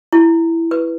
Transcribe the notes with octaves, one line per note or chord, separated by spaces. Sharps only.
E4
B4